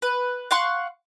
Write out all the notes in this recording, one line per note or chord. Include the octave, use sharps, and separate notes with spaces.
B4
F5 F#5 C6 C#6